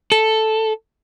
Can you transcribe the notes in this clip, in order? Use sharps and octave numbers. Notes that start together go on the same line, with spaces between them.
A4